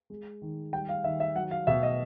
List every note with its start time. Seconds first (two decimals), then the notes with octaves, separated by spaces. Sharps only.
0.10 G#3
0.42 D#3
0.73 G3 G5
0.89 F5
1.04 D#3 E5
1.20 E5
1.36 F#3 F#5
1.51 F5
1.67 B2 E5
1.83 D#5